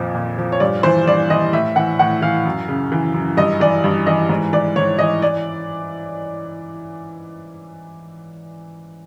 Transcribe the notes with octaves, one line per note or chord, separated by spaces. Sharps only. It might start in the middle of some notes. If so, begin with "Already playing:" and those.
Already playing: F2 A#2 F3
A#2
F3
C#5
G2 D5
E3 C5
G2 D5
E3 D#5
A2 E5
E3 F#5
A2 F#5
E3 F5
F#2
C#3
E3
F#2
G2 D#5
E3 D5
G2
E3 D#5
G#2
E3 D5
G#2 C#5
E3 D#5
D5